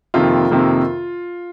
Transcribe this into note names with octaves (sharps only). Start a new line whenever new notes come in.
F2 C3 D#3 A#3 F4
F2 C3 D#3 A#3